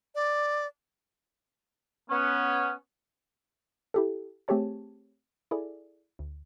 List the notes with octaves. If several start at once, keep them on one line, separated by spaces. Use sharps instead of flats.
D5
B3 C#4
E4 G4 A4
A3 C4 G4 G#4 C#5 A5
E4 G#4 A4 D5
D2